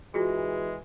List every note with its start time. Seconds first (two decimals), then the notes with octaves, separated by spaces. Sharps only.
0.14 E3 G#3 F4 F#4 G#4